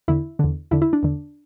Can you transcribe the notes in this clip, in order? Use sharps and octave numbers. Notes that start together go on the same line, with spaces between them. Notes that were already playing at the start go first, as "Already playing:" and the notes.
E2 D3 E4
E2 D3
E2 D3 E4
E4
D4
E2 D3